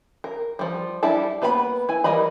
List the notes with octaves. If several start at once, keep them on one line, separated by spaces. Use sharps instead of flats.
A#4
F3 G3
G3 D4 E4 G4 A5
A#3 B3 B4 C#5 B5
E4 G#5
E3 G3 A#4 D#5 B5